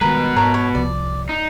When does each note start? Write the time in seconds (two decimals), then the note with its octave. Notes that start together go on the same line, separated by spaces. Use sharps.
0.01 B2 D#3 G3 G#3 A#4 B4
0.36 G#2 A#4 C#5 A5
0.54 C#5
0.75 C2 F3 D5
1.29 D#4